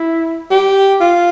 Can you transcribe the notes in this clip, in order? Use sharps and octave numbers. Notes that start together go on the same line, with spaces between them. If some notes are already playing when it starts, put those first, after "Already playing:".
Already playing: E4
G4
F4